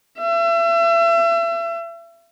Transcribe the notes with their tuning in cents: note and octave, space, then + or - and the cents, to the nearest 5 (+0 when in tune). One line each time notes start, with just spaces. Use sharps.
E5 +35